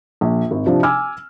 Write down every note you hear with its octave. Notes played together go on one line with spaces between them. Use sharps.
A#1
G#1
C3 F3 D4
G#5 D6 E6 F6